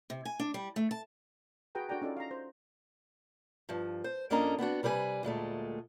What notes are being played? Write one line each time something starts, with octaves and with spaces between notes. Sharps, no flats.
C3
G#5
D4
G3
A3
A5
F#4 G#4 B4 G5 A#5
D4 F#4 A4 D5 G5 A#5
C#4 D#4 F4 A4 D5
F5 A#5
C5
G2 F3
C5
F2 A#3 C#4 D4 D#5 A#5
B3 C4 D4 F#4
C3 G3 B4 C#5 G#5
D2 A#2 G#3 A3